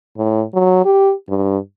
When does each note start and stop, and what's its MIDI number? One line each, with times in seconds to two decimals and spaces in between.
0.18 0.43 45
0.54 0.84 54
0.85 1.12 67
1.29 1.58 43